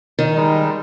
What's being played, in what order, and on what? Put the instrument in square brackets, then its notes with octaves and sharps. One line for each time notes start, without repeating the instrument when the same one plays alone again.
[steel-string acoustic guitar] D#3
[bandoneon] G3 G#3 D#4